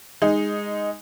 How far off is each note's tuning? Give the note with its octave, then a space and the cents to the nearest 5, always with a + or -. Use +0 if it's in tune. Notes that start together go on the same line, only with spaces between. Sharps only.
G#3 -10 D#4 +0